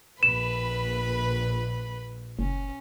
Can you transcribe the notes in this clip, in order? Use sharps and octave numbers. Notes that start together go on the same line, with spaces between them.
A#1 B4 B5 E7
F#1 C#4